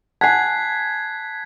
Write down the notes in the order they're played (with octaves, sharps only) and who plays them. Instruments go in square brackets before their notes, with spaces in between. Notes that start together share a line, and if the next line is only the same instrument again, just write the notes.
[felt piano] F#5 G#5 [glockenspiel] A5 F#6 C7 [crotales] G#6 B6